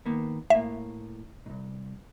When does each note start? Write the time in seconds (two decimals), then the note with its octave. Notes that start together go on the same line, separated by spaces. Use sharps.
0.06 D#3 A#3 B3
0.50 A2 A#3 E5
1.46 C2 G#2